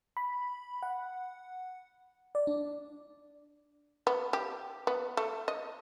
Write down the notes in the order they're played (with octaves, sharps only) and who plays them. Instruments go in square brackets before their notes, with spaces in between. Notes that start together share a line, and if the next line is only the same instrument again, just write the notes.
[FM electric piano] B5
F#5
D5
D4
[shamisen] B3
G4
B3
A3
D#5